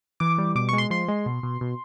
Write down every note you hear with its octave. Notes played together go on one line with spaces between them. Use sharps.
E3 D6
G3
B2 D6
G#3 C#6
C6
F3 C6
G#3
B2
B2
B2